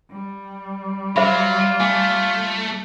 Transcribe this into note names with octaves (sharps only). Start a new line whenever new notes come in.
G3
F#3 F4 C5 E5 B5
A3 G#5